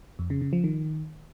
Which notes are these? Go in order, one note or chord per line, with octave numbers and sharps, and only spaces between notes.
F2
C#3
C#3
F3
D#3